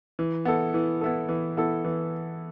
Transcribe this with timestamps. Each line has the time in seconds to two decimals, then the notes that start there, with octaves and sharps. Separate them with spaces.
0.19 E3
0.45 B3 E4 A4
0.74 E3
1.01 B3 E4 A4
1.29 E3
1.57 B3 E4 A4
1.84 E3